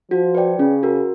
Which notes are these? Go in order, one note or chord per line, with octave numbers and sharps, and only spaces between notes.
F3 F#4
B4 D5 G5
C#3 C#4
F#4 A#4